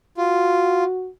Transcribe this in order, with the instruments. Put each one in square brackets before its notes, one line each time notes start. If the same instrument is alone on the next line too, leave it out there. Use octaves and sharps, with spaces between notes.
[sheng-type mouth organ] F4 [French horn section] F#4